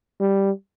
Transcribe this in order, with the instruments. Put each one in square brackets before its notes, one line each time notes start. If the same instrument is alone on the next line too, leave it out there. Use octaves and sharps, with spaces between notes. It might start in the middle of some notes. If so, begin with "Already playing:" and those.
[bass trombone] G3